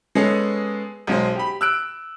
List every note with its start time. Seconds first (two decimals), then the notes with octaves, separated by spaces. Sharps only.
0.15 G#3 B3 C#4 G#4 A4
1.07 B1 G#3 C5
1.36 G4 B5
1.61 E6 F#6 D7